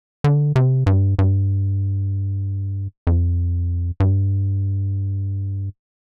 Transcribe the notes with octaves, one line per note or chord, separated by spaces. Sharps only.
D3
C3
G2
G2
F2
G2